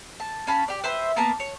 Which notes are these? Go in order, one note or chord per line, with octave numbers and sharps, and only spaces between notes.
A5
C#4 F5 A5 B5
G4 D5
B4 C5 E5 C6
A#3 B3 A5 A#5
C#5